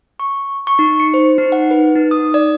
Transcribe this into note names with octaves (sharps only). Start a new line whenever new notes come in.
C#6
C#6
D#4
C#7
C5
D#4
F#5
B4
D#4
D#6
D5